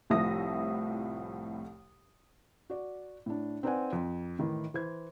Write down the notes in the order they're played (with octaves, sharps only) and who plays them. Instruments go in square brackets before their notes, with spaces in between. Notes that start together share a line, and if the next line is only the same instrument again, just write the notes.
[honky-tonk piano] C2 A2 F3 E5 D#6 A#6
[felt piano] F#4 D5
A2 D4
C4 D#4 B4 D5 F#5 G#5
F2
A2 D#3 E3
E3 C5 G#6